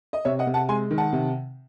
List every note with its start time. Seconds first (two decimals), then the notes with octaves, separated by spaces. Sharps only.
0.13 D#5
0.25 C3 C#5 E5
0.39 D#5 F#5
0.47 C3
0.54 F#5 A5
0.69 G#3 G#5 C6
0.91 D#3
0.98 F#5 A5
1.13 C3